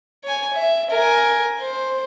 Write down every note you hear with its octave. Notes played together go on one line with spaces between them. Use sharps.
C#5 G#5
E5
A#4 G#5
C5